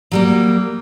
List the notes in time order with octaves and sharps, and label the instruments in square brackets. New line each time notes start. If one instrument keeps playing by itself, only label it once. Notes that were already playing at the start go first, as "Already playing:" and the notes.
[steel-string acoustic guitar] F#3 G3 A#3